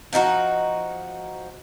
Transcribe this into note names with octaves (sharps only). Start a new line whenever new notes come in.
F3 D#4 F4 F#4